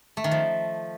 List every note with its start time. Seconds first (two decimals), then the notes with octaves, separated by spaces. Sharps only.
0.17 A3
0.24 D#3
0.31 F3